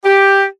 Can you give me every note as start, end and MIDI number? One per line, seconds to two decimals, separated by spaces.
0.04 0.44 67